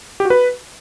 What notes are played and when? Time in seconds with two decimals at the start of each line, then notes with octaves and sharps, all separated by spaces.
0.20 G4
0.25 F#4
0.30 B4